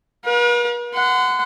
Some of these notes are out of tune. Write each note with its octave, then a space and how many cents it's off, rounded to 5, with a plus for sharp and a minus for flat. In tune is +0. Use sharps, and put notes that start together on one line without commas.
B4 -45 F5 +40
F#5 +0 C6 -35